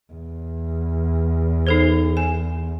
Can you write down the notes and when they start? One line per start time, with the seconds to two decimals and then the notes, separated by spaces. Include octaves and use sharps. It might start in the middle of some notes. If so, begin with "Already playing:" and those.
0.14 E2
1.67 D#4 A4 C5
2.17 G#5